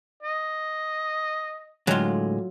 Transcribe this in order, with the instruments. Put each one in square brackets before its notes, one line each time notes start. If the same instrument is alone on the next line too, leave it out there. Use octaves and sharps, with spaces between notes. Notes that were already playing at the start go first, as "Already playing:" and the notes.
[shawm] D#5
[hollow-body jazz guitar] A2 D3 G#3 [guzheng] F#3 F4